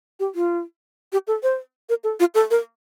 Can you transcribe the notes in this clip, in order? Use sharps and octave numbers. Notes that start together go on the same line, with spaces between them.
G4
F4
G4
A4
C5
A#4
A4
F4
A4
A#4